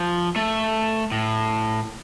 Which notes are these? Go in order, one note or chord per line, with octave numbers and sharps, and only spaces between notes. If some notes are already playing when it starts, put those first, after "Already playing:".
Already playing: F3
A3
A2